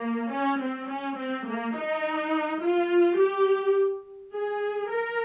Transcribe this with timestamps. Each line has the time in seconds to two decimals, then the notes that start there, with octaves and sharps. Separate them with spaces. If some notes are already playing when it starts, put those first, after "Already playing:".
Already playing: A#3
0.32 C#4
0.61 C4
0.89 C#4
1.18 C4
1.46 A#3
1.75 D#4
2.61 F4
3.18 G4
4.33 G#4
4.90 A#4